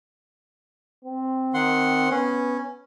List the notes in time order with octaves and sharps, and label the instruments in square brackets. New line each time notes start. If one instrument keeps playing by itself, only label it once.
[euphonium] C4
[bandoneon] D#3 F#5 C6
[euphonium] B3 [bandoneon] C#4